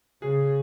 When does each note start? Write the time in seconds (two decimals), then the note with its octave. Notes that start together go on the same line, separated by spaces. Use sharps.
0.22 C#3 G#4